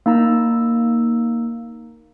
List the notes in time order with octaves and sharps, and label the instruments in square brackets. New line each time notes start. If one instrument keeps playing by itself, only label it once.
[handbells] A#3 D#4 A#5 E6